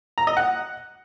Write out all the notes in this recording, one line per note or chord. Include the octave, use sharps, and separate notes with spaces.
A#5
D#5
F#5